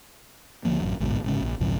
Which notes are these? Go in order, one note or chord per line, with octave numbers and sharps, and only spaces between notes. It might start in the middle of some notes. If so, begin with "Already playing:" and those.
C#2 D3 F3 A#3
A1 F#2
A1 D2 G#2 B2
G1 G#2 C#3
A#1
B1 F2 G#2 C#3